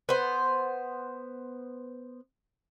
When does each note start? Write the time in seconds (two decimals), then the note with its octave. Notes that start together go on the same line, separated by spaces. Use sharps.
0.09 B3 C5